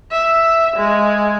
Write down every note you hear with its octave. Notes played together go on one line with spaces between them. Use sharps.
E5
G#3